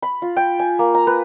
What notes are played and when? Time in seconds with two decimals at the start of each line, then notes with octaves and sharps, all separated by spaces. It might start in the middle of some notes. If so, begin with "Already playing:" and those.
0.02 B5
0.22 F4
0.36 G5
0.59 G#5
0.79 A#3
0.95 A#5
1.07 B4